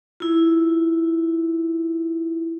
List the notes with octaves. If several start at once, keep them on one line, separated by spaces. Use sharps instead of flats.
E4 F4